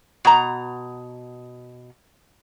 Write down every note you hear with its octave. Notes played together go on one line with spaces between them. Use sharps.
B2 A#5